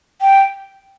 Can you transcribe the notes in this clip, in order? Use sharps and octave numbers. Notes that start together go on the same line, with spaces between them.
G5